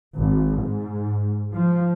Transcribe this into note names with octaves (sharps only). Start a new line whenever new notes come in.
G#1
G#2
F3